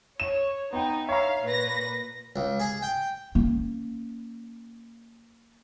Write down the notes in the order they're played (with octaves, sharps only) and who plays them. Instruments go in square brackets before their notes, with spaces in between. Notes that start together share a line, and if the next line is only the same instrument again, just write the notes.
[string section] C#5 [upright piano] E7
[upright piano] B3 G5 [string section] D#4
[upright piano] C#5 A#5 [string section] E5 F5
[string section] A#2 B4 A#6
[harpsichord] C#2
G#4
G5
[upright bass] A#3 C#4